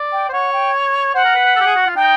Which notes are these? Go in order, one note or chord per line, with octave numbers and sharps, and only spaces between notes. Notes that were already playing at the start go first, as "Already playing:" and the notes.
Already playing: D5
G5
C5
C#5 F#5
G5
C5 F#5
A#4
B4
B4
A4
G4
G#4
F#4
F4
D#4 G5